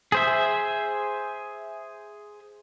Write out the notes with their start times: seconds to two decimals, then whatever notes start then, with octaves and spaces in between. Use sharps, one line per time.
0.12 G#4 C5 E5